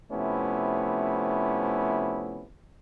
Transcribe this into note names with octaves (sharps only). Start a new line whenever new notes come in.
C3 F3 A3 B3 C#4 E4